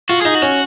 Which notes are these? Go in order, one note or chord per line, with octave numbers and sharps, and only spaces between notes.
F4 F#4
D#4 G#4
F#4
C#4